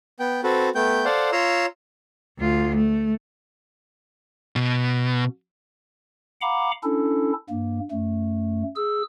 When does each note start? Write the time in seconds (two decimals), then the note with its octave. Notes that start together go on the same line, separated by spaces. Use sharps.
0.20 B3 G5
0.44 C4 F#4 A4 B4
0.75 A3 B3 G5 G6
1.05 A4 C5 D5 F5 F#5
1.32 F4 C#5 A#5 C6 E6
2.38 D2 F4
2.76 A3
4.56 B2
6.41 F5 F#5 A#5 B5 D6
6.83 C#4 D4 E4 A4
7.50 G2 A#3
7.91 F#2 A3
8.76 G#4 E6